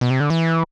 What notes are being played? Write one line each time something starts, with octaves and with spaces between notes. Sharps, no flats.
B2
C3
D3
E3